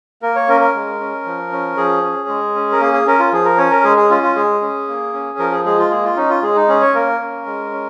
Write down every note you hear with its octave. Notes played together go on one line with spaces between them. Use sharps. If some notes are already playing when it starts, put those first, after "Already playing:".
A#3 A#4
C#5
C#4 A#4
A#4
G#3
C#4
F3
C#4
F3 G#4
C#4
G#3
C#4
A#4
A#3 G#4
G#4
C#4 A#4
F4
F3 G#4
A#4
C#4 C#5
A#4
G#3 G#4
G#4
C#4 F4
F4
G#3 G#4
C#4
A#3
C#4
F3 A#4
G#4
G#3 G#4
F4
A#3 G#4
F4
C#4 D#4
F4
G#3 G#4
D#4
C#4 G#4
C#5
A#3 A#4
C#4
G#3
C#4